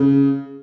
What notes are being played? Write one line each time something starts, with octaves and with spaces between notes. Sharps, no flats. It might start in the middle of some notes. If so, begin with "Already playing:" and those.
Already playing: C#3